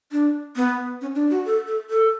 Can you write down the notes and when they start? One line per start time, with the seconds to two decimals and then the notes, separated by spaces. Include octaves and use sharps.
0.12 D4
0.56 B3
1.01 C#4
1.15 D4
1.31 F#4
1.46 A4
1.67 A4
1.90 A4